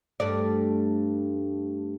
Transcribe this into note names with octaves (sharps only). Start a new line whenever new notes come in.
G2 A3 D5